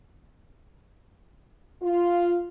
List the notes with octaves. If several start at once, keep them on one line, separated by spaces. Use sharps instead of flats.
F4